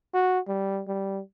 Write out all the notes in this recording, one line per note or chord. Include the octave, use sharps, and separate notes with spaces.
F#4
G3
G3